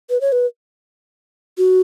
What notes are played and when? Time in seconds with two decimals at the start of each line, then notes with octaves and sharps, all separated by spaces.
0.10 B4
0.21 C#5
0.32 B4
1.58 F#4